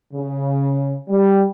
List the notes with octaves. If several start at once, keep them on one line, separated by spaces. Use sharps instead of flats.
C#3
G3